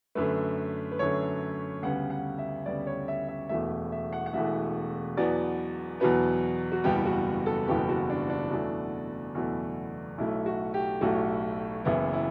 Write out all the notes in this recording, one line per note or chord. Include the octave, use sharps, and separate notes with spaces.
F#2 D3 A3 B4
B4
F#2 D3 A3 C#5
D2 C#3 G3 B3 F#5
F#5
E5
D2 C#3 G3 B3 D5
C#5
E5
E5
E1 E2 B2 A3 E5
E5
F#5
F#5
E1 E2 B2 A3 E5
E2 B2 F#3 B3 D5
E2 B2 F#3 B3 B4
F#4
F#1 E2 B2 G3 B3 G4
F#4
A4
F#1 E2 B2 G3 B3 G4
F#4
D4
D4
E2 B2 F#3 A3
E2 B2 F#3 A3
B1 A2 F#3 A3 E4
F#4
G4
B1 A2 F#3 A3 F#4
F#1 F#2 E3 B3 E4
E4